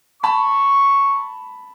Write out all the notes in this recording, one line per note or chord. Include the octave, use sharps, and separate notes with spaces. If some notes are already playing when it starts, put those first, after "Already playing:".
A5 B5 C#6